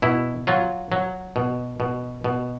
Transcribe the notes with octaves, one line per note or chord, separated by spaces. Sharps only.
B2 E4
F#3 F4
F#3
B2
B2
B2